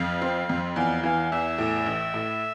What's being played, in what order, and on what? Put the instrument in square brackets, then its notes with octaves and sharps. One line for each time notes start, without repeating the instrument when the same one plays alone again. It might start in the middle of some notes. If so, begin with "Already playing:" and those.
Already playing: [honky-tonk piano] F2 F3 [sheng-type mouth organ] F5
[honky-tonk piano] C4
F2
[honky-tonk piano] E2 [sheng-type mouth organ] F5
[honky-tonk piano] E3 [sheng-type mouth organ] F5
[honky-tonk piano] E2 [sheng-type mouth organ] E5
[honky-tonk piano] A2
A1
A2